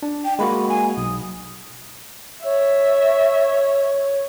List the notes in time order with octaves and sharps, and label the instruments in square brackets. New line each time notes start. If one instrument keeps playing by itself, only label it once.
[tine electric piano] D4
[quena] G5
[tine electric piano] G#3 A#3 F#4 [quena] B5
[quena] G#5
[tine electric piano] B1 [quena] D#6
[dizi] C#5 [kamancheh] E5